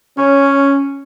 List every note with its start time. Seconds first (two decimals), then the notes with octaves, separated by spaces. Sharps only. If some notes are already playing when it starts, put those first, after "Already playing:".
0.18 C#4